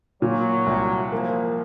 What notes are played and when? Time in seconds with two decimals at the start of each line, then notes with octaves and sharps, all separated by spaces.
0.22 A#2 F#3
0.67 C2
1.11 F3 A#3